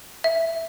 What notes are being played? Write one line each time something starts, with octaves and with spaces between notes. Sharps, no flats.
E5